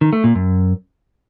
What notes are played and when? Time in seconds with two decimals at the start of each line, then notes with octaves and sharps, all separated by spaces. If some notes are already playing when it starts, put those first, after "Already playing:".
0.01 D#3
0.13 A3
0.24 A#2
0.35 F#2